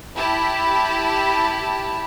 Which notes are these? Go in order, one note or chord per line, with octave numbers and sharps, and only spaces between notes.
E4 G4 A5 B5